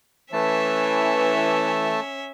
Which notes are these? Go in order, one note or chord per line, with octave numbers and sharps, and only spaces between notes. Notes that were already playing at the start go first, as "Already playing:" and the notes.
E3 A3 C#4 E5 A5